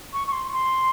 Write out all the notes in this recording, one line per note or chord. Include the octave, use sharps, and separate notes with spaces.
C#6
C#6
C6
C6